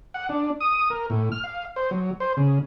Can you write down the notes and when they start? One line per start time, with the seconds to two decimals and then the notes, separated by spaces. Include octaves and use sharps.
0.14 F#5
0.29 D4
0.60 D#6
0.90 A#4
1.10 A2
1.32 F6
1.44 F5
1.76 C5
1.91 F#3
2.20 C5
2.37 C#3